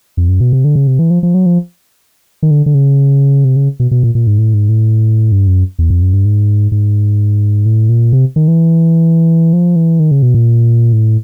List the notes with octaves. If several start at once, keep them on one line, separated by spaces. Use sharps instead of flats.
F2
F#2
B2
C3
D3
C#3
C3
E3
F3
F3
F#3
F3
D#3
D3
D3
C#3
C3
C#3
B2
B2
A#2
A#2
G#2
A2
G#2
A2
G2
F#2
E2
F2
F#2
G2
G#2
G#2
A2
A#2
C3
D#3
E3
F3
E3
D#3
C#3
B2
A#2
A2